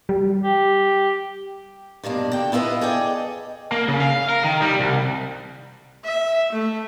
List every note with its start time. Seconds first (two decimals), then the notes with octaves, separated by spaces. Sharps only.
0.09 G3
0.43 G4
2.04 G2 B2 A#3 D4
2.32 D3 G5
2.52 B3 E4 F4 G#4 B4 D#5
2.81 G#4 A4 D5 D#5 G5
3.72 A#3
3.88 C#3
4.01 F5
4.29 A#4
4.44 D#3
4.62 G3
4.80 C2
6.04 E5
6.52 A3